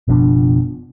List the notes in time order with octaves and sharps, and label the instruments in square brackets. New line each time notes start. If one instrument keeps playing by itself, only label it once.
[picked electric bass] F#1 B2 F3 D4